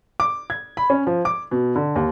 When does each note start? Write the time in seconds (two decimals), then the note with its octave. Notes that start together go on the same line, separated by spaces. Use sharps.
0.20 D6
0.50 G#6
0.77 B5
0.90 C#4
1.07 F3
1.25 D6
1.51 B2
1.76 D3
1.95 D#2